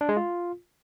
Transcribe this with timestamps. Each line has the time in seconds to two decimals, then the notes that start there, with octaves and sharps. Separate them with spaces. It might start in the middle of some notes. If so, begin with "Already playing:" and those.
0.01 D4
0.09 G#3
0.17 F4